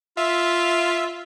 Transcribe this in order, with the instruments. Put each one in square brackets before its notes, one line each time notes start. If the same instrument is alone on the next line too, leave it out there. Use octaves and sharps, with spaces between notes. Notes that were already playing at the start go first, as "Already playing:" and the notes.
[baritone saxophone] F4 [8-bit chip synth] E5